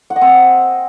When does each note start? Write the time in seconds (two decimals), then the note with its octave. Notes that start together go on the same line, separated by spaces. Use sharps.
0.10 F#5
0.16 D#5
0.21 C4